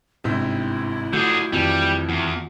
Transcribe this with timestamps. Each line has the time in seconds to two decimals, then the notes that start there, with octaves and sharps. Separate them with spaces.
0.24 G1 G#2 C3 E4
1.13 D3 A3 F4 F#4 G#4 G6
1.53 F2 D#3 E3 G3 F4
2.09 E2